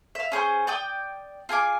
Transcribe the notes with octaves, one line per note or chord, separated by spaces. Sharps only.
E5 F5
C#4 G#4 B4 C5
D5 G5 D#6
F4 G#4 G#5 D6